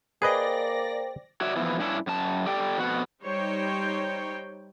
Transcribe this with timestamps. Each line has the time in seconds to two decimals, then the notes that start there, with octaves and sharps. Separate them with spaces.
0.22 A#3 G#4 B4 C5 D5 D#5 G5 A#6
1.41 F#4 C#5 D5 E5
1.56 E3 F3 B3 E4
1.79 G2 C#4 D4 E4
2.07 F#2 A5
2.46 G4 A4 D5 G5
2.78 F2 B3 F#4 F#5
3.23 G3 D#4 C5 C#5 G5